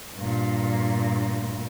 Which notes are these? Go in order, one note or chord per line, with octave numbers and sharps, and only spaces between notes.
G2 A#2